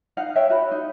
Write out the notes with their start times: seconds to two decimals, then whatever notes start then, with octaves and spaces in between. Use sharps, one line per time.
0.17 D#4 F5 F#5
0.36 C#5 E5 G5
0.50 F#4 B5
0.71 D#4